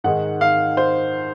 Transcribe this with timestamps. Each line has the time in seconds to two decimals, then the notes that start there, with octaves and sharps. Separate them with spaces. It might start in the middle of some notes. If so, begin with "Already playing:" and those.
0.04 G#2 D#3 G#3 F#5
0.41 F5
0.77 C5